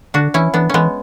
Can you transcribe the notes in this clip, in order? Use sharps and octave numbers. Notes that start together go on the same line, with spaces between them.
D3 D4 F#4
E3 C#4 E4
E3 B3 D4
E3 G#3 B3 C#4